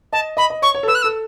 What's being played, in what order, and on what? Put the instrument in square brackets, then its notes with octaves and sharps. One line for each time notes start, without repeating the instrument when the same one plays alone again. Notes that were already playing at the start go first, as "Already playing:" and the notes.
[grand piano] D#5 [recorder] A5
[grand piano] D#5 [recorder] B5
[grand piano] D#5
[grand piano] C#5 [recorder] C#6
[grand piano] C#5
A4
[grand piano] B4 [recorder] E6
[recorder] F#6
[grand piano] A4 [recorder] E6